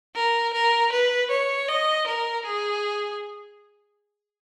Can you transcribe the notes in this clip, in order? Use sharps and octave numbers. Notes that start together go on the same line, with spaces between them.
A#4
A#4
B4
C#5
D#5
A#4
G#4